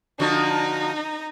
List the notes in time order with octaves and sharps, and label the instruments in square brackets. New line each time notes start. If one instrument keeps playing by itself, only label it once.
[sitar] D3 F3 F#4 [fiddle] D#4 A#5